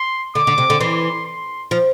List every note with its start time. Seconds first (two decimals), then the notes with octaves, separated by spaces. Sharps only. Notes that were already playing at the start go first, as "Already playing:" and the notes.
Already playing: C6
0.35 D3 D6
0.47 D3
0.58 C3
0.70 D3
0.81 E3 C6
1.26 C6
1.71 F3